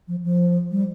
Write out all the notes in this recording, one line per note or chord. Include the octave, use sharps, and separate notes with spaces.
F3
F3
G3